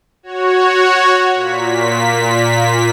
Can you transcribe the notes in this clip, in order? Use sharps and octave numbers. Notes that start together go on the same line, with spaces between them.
F#4 C#5
A#2 B6